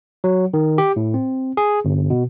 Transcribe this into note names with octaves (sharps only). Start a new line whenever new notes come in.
F#3
D#3
G4
A2
C4
G#4
G1
B2